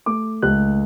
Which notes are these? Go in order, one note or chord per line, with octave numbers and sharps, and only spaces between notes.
A3 D6
C#2 F#6